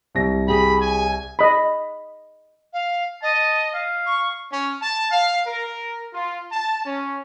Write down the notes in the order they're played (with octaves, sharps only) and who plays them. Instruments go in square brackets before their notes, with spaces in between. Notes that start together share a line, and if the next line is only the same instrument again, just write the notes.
[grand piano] C2 A#6
[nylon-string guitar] G4 G#4 [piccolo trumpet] B5
[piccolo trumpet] G#5
[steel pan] D#5 B5
[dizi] F5
[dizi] D#5 [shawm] A5
[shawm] F5
[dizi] C#6
[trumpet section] C#4
A5
F5
A#4
F4
A5
C#4